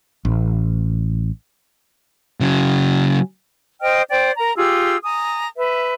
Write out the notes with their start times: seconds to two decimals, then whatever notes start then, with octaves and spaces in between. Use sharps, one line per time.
0.25 A1
2.40 C#3 F#3
3.82 C5 D#5 G5 F6
4.10 C5 D5 G5
4.37 A#4 A#5
4.56 F4 G4 G#4 E6
5.03 G#5 A#5 D#6
5.57 B4 E5